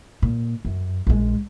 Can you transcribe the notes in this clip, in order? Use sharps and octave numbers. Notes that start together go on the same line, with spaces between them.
A#2
F#2
A#1 G#3